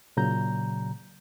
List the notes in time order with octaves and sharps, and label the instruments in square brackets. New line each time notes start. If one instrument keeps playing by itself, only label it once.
[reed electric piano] A#2 C#3 F#3 A#5 G6